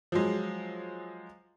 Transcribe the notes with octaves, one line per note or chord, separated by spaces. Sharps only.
F3 F#3 G#3